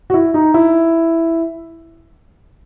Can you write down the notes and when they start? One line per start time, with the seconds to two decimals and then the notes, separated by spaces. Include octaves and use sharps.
0.10 F#4
0.14 E4
0.34 D#4
0.54 E4